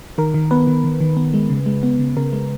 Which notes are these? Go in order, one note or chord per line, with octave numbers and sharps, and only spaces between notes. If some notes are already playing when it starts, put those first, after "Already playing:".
D#3 A#4
D#3
B3 B4
D#3
D#3
D#3
B3
G#3
C#3
G#3
B3
C#3
C#3 A#4
G#3